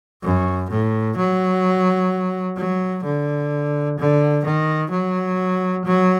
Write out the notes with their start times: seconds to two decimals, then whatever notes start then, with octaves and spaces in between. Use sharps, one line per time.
0.23 F#2
0.71 A2
1.17 F#3
2.57 F#3
3.04 D3
3.98 D3
4.45 D#3
4.91 F#3
5.85 F#3